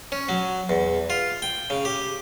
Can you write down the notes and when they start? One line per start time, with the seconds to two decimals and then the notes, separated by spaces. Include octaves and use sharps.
0.12 C#4
0.29 F#3
0.69 E2
1.10 F4
1.42 G5
1.70 C#3
1.85 G4